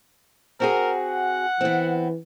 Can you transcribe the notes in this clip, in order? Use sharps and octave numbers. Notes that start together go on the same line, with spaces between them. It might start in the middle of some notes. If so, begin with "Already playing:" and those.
C4 F#4 G#4 A#4
F#5
E3 B3 C4